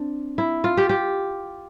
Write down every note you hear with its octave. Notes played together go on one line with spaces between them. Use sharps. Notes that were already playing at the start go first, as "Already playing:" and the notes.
Already playing: C4 D4
E4
F4
G4
G4